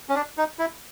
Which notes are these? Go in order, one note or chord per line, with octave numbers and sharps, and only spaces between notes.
C#4
D4
D#4
E4